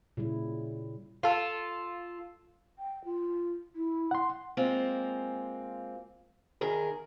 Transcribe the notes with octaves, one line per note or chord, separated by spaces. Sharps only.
A#2 C#3 G3 E4
F4 A4
G5
F4
E4
F#5 C6
G#3 A#3 C4 F4
E2 D#3 G#4 A#4